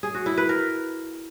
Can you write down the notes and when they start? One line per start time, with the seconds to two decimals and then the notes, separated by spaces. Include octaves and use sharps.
0.03 G#4
0.14 F#4
0.26 E4
0.38 B4
0.49 A#4